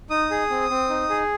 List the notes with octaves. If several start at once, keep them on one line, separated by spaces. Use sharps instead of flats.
D#4 D#6
G#4
C4
C4
D#4
G#4